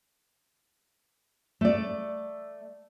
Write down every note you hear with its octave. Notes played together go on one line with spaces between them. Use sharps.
A3 D5